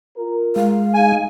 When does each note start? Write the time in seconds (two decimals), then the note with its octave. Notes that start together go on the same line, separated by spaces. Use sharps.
0.17 F4 A#4
0.56 G#3 F5
0.94 D#4 G#4 G#5